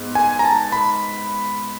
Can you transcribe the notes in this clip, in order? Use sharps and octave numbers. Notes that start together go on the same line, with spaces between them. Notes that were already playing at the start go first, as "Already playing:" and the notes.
Already playing: G#2 B3
G#5
A#5
A5
B5